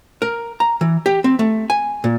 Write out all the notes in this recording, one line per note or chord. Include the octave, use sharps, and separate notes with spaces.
A#4
A#5
E3
G4
C4
A3
G#5
A#2